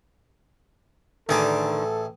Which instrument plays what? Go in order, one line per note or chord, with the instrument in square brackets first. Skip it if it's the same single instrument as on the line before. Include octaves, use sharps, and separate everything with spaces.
[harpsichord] A1 G#4 D6 [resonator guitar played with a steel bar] D3 D#3 [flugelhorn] A4